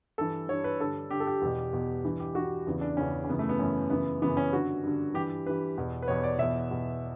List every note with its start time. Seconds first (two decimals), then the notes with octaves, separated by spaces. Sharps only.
0.18 G2 E3 A4
0.49 G2 E3 C#5
0.64 B4
0.80 G2 D3 A4
1.10 G2 D3 G4
1.20 A4
1.27 G4
1.41 E2 B2
1.73 E2 B2
2.04 G2 E3
2.20 G4
2.35 G2 E3 F#4
2.67 E2 C#3 E3
2.81 D4
2.97 E2 C#3 E3 C#4
3.24 C#4
3.28 F#2 C#3 E3 B3
3.39 A3
3.49 B3
3.59 F#2 C#3 E3 C#4
3.90 F#2 C#3 E3 B3
4.22 F#2 C#3 E3 B3
4.37 C#4
4.53 G2 D3 F#4
4.83 G2 D3
5.14 G2 E3 G4
5.46 G2 E3 B4
5.78 E2 B2
6.02 B4
6.08 E2 B2 C#5
6.24 D5
6.38 E2 B2 E5
6.71 E2 B2